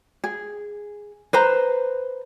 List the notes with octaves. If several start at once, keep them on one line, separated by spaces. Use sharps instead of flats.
G#4
B4 C5 A#5